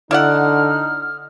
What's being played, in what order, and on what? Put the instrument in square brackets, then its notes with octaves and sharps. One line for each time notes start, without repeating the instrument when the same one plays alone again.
[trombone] D3 [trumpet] D#4 [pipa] E4 D5 F#5 [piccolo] F6